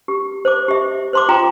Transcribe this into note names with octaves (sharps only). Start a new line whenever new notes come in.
G4
C5 D6
G4 E5
C5 C6 D6
F4 G#4 G5 A#5